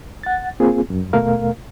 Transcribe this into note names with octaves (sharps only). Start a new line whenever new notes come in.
F#5 A6
A#3 C4 F4 G#4
F#2
D#2 B2 A3 A#4 F5